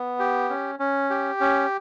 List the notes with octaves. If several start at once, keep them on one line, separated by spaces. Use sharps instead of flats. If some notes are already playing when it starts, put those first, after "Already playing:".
Already playing: B3
G4
C#4
C#4
G4
C#4